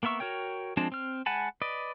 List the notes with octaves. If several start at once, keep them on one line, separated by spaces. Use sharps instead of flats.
A#3 B3 A#4 E5 C#6
F#4 A#4 C#5 G5
F3 G#3 C4 D4 A5
C4 F6
G#3 F#5 G#5 A5 B5
B4 D5 D#5